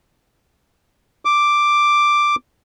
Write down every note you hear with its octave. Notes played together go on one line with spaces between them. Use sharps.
D6